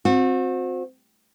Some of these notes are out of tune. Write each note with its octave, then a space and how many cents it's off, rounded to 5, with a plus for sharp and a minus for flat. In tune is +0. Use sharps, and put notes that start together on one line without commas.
C4 +0 F#4 -35